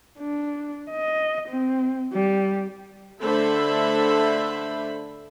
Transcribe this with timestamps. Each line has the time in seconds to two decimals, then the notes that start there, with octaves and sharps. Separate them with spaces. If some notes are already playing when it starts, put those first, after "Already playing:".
0.19 D4
0.91 D#5
1.48 C4
2.13 G3
3.21 D3 A3 A4 C5 E5 B5